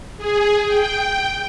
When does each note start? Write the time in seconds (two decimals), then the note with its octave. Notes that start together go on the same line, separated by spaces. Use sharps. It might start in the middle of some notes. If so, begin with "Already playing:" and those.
0.18 G#4
0.65 G5